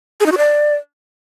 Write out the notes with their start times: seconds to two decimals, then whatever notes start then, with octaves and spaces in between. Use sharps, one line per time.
0.20 G#4
0.26 D#4
0.32 F#4
0.37 D5